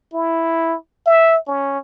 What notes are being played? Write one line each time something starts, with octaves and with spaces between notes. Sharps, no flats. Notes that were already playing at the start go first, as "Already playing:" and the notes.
E4
E5
C#4